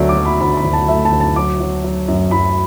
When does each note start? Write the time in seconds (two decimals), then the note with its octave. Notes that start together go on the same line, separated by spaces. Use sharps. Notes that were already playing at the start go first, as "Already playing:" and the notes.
Already playing: D2 F#3 A3 D5 E5
0.09 D6
0.18 F#3
0.25 B5
0.41 D2 B5
0.57 B5
0.64 D2
0.73 A5
0.88 A3 E5
1.05 A5
1.12 D2
1.20 A5
1.36 F#3 D6
1.61 F#3
1.84 F#3
2.08 F#2
2.31 F#2 B5